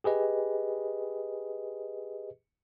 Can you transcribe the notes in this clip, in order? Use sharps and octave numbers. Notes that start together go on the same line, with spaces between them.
G4 G#4 B4 D#5